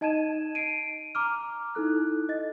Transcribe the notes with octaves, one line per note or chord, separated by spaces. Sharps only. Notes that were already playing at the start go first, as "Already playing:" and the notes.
D#4 D#5 A5 G#6 D#7 E7
C7 D7 D#7
A#5 D6 F6
D#4 E4 A4 F#6
D#5 A6